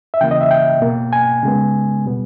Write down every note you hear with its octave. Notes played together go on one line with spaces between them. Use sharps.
E5
C#3 E3 A#3 G5
D#5
E5
G5
B2 A#3
G#5
C#3 G#3 B3
B2 G3 B3